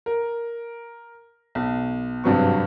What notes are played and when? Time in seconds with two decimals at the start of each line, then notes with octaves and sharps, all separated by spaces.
0.06 A#4
1.55 B1
2.24 G#1 G2 C3 F#3 B4 C#6